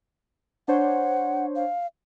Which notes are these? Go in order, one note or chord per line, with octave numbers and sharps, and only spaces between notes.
D4 C5 C#5 F#5
F5